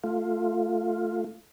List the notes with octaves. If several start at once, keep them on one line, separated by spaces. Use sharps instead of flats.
A3 F4